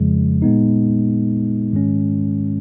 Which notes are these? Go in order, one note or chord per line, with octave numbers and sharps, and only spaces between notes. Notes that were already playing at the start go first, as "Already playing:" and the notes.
Already playing: F2 C#3 F3 G#3
A#2 G#3 B3 D#4
G#2 D#3 G#3 C#4